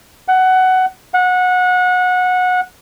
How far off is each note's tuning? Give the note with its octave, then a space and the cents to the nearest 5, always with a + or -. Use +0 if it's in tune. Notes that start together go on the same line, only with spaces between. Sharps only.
F#5 +15
F#5 -20